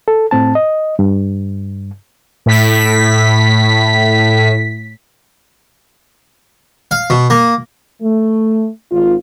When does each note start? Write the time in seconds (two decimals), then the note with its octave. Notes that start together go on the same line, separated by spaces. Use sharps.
0.08 A4
0.31 A2 C4 A5
0.55 D#5
0.99 G2
2.46 A2 B6
6.91 F5
7.10 B2
7.30 A#3
8.02 A3
8.91 G#1 F4